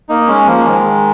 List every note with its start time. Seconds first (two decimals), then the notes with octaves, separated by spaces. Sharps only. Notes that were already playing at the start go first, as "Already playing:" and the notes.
0.09 A#3 D#4
0.28 G#3 C#4
0.47 F3 A#3
0.66 D#3 G#3